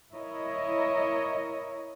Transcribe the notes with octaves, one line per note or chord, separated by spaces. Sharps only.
E4 A#4 C#5 D#5